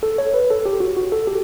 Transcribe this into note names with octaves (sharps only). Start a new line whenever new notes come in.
A4
C#5
B4
A4
G4
F#4
F#4
A4
G4